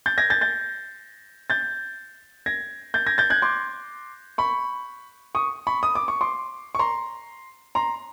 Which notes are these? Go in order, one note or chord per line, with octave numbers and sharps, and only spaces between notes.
G6 A6
G#6 A#6
G6 A6
G6 A6
G6 A6
G#6 A#6
G6 A6
G#6 A#6
G6 A6
F#6 G#6
C6 D6
B5 C#6
C#6 D#6
B5 C#6
D#6
D6
C#6
C6 D6
C#6
A#5 C6
A#5 C6